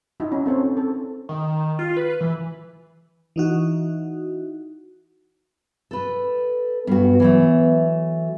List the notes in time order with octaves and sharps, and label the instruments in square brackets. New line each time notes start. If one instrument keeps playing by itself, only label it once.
[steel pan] D#4 E4 F#4
C#4
C4 A4 C5 C#5
C#4
A4
[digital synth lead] D#3
F4
B4
E3
[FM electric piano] E3 D#4 F#4
[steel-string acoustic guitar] A4 B4
[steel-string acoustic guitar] G2 F#4 [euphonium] B3
[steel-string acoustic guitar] E3 F#3 A3